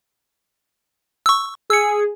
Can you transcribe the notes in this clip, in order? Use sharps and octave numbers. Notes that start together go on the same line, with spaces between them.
C#6 E6
G#4 E6 C#7